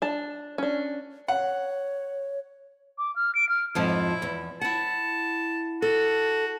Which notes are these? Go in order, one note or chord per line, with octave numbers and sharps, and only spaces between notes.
D4 A5
C#4 D4
C#5 F#5
D6
F6
D7
F6
F2 G#2 F3 E4
E2
E4 F#5 A5
F#4 A4